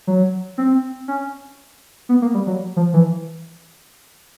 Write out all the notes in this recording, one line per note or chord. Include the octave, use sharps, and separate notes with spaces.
F#3
C4
C#4
B3
A#3
G3
F#3
F3
E3